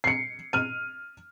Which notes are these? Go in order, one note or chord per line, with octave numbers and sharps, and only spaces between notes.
C7 C#7
F6 D#7